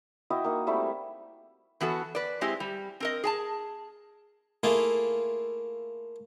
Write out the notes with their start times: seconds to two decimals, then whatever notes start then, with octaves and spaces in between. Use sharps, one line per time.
0.30 E4 F#4 D#5 G5
0.44 A#3 D#4
0.67 G3 A3 C4 E4
1.80 E3 B3 F#4 A4
2.15 B4 D5
2.41 G#3 C4 E4 G4
2.60 G3
3.00 C4 A#4 D#5
3.24 G#4 G#5 A5
4.63 A3 A#3 E4 F4 G#4